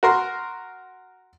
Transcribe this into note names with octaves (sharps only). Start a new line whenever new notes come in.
F#4 A#4 C6